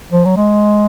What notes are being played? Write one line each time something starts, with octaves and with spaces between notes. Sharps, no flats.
F3
F#3
G#3